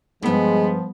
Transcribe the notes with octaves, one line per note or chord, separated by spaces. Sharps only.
D2 G2 F3 G#3 B3